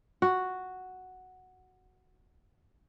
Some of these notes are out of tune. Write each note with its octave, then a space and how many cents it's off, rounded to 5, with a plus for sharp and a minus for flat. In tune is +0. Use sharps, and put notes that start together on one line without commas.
F#4 +0 F#5 +0